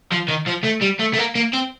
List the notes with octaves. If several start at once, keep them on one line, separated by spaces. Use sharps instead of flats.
F3
D#3
F3
A3
G3
A3
A3
A#3
A#3
C4